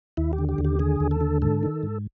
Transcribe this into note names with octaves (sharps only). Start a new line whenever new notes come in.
D#2 E4
G4
D3
G4
D#2
G4
D3 G#4
D#2
A4
D3
G#2 A4
D#3
G#2